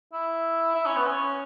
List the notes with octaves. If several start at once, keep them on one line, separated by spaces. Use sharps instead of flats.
E4
E4
C#4
B3
C#4